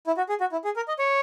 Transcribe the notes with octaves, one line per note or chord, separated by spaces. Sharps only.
E4
F#4
G#4
F#4
E4
G#4
A#4
D#5
C#5